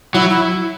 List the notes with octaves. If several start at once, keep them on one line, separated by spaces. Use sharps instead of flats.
F#3 E4
E4